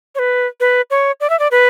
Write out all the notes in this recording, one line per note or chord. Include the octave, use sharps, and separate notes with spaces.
C#5
B4
B4
C#5
D5
E5
D5
B4